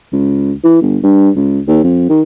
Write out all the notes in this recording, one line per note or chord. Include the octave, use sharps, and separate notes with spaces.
C#2
E3
G1
G2
C#2
D#2
F2
D#3